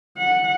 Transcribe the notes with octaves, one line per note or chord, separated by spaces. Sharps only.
F#5